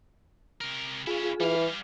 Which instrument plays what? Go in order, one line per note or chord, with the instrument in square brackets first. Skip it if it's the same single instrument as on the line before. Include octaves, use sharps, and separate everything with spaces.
[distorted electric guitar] C3 A#4
[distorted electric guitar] C#4 E4 [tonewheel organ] F4 G#4
[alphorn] E3 [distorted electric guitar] G3 F5